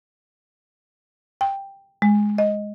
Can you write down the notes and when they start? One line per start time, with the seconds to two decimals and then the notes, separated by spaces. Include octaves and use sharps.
1.41 G5
2.02 G#3
2.38 D#5